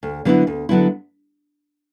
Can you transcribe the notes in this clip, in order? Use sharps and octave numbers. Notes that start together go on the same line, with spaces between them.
D2
D3 F#3 B3 E4
D2
D3 F#3 B3 E4